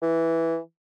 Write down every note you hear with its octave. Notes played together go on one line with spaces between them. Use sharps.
E3